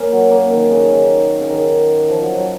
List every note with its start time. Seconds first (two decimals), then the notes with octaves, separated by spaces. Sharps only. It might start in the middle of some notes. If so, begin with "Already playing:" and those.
Already playing: A#3 C#4
0.12 F#3
0.31 A#3
0.51 D#3
0.71 C#3
0.91 D#3
1.41 C#3
1.49 D#3
2.08 F3
2.22 F#3
2.37 F#3